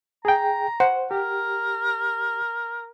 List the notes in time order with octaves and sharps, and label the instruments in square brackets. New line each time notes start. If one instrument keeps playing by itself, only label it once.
[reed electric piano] G#4 G5 [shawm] A#5
[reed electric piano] C5 [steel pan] F#5
[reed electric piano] G4 [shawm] A#4